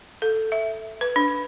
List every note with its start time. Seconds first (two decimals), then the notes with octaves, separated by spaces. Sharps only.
0.22 A4
0.52 E5
1.01 B4
1.16 D4